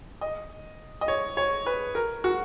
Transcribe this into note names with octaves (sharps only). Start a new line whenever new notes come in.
D#5
D#5
C#5
C#5
B4
A#4
F#4